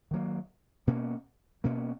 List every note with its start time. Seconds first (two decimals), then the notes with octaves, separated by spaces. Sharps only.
0.11 D#3 F#3 A#3
0.87 B2 A#3 C#4
1.64 B2 A#3 C#4